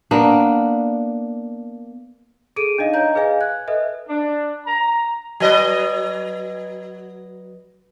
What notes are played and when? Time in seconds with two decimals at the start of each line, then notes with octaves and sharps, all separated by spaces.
0.11 A#3 B3 D4
2.56 G#4 A4 D7 D#7
2.78 D4 D#4 D#5 F5
2.94 D4 C#5 D#5 A#5 G6
3.15 G#4 B4 D#5 F5 G#5
3.41 F#6 G#6
3.68 A4 B4 D#5 E5
4.09 D4
4.67 A#5
5.40 F#3 B4 D#5